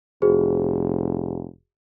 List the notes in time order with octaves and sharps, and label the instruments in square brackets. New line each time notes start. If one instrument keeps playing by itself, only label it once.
[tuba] F1 [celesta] F#4 G#4 C5